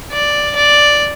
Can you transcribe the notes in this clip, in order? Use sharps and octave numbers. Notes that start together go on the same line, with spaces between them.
D5
D5